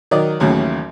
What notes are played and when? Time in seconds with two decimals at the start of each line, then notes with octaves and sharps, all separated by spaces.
0.11 D#3 F#3 D5 D#5
0.40 A1 D#2 A2 C#3 F#3